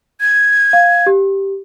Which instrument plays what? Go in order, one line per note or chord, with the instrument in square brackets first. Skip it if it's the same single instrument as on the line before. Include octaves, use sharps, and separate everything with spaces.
[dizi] G#6
[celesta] F5
G4